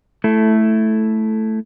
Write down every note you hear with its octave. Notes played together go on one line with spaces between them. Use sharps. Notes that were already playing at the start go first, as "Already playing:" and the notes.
A3 E4 A4